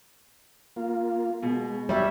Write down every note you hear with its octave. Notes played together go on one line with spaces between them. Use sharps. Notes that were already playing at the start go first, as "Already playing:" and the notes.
A#3 F4
B2 G#3
G3 C#5 E5